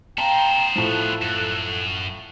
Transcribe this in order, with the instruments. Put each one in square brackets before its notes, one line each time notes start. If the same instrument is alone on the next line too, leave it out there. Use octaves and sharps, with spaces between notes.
[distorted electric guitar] B3 C5 [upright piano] F5 A5 [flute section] G5 A#5
[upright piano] A2 F3 [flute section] A4 F#6
[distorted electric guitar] F#2